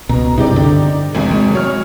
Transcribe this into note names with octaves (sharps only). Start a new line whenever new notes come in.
C#2 B2 A#5
G2 C3 D#4 G4 D5
D3
G#1 E2 C3
G#3
F#3 C#5 F6